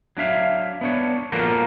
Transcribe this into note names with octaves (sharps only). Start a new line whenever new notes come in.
F#3 D4 E5 F5
B3 D4 C#5
F3 A#3 F4 F#4 A4 A#4